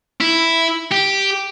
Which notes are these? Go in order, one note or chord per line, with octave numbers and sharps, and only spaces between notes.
E4
G4